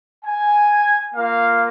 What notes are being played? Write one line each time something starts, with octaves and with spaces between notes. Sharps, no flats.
G#5
A#3 F4 F5